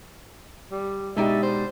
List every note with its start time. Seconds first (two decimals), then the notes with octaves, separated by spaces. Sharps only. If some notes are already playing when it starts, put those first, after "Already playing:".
0.72 G3
1.17 B2 G#3 D#4 G4 D5 E5
1.43 C5